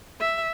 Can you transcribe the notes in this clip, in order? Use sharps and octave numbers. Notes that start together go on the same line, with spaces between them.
E5